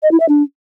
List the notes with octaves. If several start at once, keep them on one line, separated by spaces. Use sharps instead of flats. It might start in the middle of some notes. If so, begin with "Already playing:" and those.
D#5
E4
E5
D4